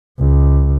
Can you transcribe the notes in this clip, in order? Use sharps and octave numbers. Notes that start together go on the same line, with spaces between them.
C#2